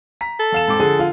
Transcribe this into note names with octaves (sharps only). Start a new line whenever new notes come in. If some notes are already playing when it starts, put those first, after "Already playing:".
A#5 B6
A4
E2 F5 E7
G#2 C4 D6
D3 F3 G#4 G#5
F4